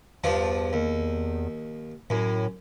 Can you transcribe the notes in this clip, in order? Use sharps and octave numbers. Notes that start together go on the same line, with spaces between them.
E2 G2 F3 D4
D#2
F#2 A2